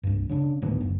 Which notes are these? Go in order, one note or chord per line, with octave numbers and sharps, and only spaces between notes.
C2 G2
C#3 C#4 D4
D2 A2 D#3 B3
F#1